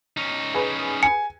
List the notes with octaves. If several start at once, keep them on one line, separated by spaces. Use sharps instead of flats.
C#4 D#4
G#4 B4
G#5 C#7